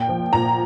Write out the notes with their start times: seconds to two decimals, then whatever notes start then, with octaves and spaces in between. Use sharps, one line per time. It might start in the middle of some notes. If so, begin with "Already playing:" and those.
Already playing: A#2 G5
0.09 F3
0.33 A#2 A#5